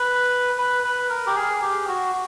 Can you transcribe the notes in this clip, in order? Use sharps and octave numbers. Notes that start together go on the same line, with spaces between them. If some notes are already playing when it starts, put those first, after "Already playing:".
Already playing: B4
B4
B4
A#4
G4
G#4
G4
F#4